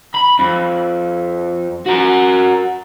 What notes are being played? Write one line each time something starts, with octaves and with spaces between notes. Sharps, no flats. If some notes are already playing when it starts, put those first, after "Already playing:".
B5
F2
F#4 A#4